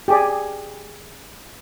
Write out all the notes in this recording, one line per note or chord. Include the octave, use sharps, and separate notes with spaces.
G4 G#4 D5